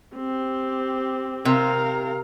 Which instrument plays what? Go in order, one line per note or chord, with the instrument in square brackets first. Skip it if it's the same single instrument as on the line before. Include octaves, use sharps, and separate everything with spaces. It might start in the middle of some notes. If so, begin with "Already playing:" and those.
[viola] C4 G4
[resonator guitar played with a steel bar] C3 [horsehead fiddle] A#4 F5